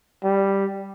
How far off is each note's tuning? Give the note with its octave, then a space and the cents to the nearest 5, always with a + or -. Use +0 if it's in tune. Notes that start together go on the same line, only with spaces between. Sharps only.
G3 +0